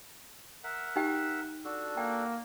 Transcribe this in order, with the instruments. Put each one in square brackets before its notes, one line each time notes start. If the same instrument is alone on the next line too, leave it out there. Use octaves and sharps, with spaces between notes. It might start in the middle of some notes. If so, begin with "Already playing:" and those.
[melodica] A#4 E5 F#5
[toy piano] D#4 G4 G5
[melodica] D4 F#4 A4
[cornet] A#3 [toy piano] G5